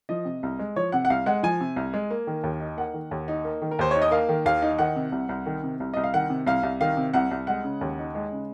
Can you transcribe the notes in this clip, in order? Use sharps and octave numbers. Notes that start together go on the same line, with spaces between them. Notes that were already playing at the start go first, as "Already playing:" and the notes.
F3 D#5
C3
C2
G#3
F3 C#5
C3 F#5
F#5
C2 F5
G#3 F#5
F3 G#5
C3
C2
G#3
A#3
D#3
D#2
D#4
A#3 F#5
D#3
D#2
D#4
A#3
D#3
A#4
D#2 C5
D#4 C#5
D#5
A#3 F5
D#3
D#2 F5
D#4
D#3 F#5
C3
C2
C2
D#3
C3
C2
C2 D#5
F5
D#3 F#5
C3
C2 F5
C2
D#3 F5
C3
C2 F#5
C2
G#3 F#5
C#3
D#2
D#4
G#3
C#3